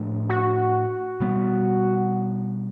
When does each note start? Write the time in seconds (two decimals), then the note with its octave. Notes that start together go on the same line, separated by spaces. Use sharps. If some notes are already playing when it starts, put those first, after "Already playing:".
Already playing: A2 F3 A3 D4
0.29 F#4
1.20 B2 G3 B3